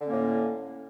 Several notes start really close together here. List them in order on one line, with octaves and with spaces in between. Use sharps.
D3 C#4 A#3 A2